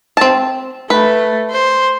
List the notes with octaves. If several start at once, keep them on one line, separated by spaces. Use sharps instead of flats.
C4 A5
A3 B4
C5